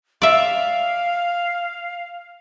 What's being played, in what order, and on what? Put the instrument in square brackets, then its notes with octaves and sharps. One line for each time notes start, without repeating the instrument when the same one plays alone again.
[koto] D5 E5 [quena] F5